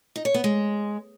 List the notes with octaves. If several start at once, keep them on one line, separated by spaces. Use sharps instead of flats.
D#4
C#5
B3
G#3